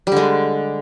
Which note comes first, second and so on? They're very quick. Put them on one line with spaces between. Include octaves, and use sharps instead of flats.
G3 D3 G#3